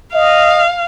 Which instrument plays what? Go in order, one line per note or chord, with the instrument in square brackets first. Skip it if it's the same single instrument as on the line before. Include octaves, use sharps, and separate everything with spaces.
[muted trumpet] D#5 [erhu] F5